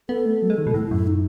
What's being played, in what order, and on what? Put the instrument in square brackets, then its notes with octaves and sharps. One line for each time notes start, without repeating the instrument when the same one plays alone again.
[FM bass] B3 [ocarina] A4
[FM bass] A3
F#3
G#3
D#3
B2
[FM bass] A2 [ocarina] E4
[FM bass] F#2
[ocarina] D#4